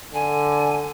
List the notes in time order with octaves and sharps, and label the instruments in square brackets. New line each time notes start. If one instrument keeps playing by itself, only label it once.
[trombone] D3 [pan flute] G#5